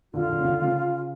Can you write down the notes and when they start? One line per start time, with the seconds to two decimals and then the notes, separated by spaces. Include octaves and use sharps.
0.14 D3 F4
0.29 D3
0.38 C#3
0.45 D3
0.62 C#3